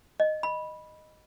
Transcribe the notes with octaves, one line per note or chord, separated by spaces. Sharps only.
D#5
B5